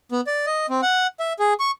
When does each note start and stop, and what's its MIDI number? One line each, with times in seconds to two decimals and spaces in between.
0.12 0.21 59
0.27 0.46 74
0.46 0.66 75
0.69 0.81 60
0.82 1.07 78
1.20 1.33 76
1.39 1.54 68
1.60 1.71 85